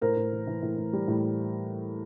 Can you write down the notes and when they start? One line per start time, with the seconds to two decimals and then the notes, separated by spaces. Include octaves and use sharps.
0.01 A2 A#4 C5
0.16 A2
0.32 E3
0.47 E3
0.62 A2
0.78 A2
0.93 G3
1.08 A2